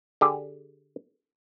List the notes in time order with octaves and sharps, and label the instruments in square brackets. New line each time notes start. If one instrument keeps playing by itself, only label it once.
[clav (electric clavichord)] D3 G4 G#4